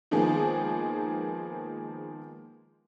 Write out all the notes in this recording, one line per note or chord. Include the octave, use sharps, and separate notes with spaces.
D#3 F3 G#3 A#3 B3 G#4